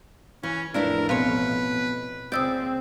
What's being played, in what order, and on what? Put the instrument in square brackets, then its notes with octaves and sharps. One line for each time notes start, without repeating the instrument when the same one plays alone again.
[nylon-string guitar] E3 [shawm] C#4
[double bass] A1 F2 [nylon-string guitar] A3 D4 E4 [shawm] A#4 [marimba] B4 D5
[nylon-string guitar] B2 C#5 [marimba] C4 F5 [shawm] B4
[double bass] C#2 C4 [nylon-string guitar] D5 [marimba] D#6 E6 G6